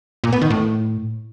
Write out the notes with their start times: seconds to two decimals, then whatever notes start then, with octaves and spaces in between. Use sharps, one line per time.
0.24 A#2
0.33 B3
0.41 D#3
0.50 A2